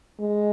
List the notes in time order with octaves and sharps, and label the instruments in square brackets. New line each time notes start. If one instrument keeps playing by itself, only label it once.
[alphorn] G#3